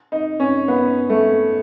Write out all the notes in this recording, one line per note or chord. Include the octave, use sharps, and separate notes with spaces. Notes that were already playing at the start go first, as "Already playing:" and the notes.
D#4
C#4
B3
A3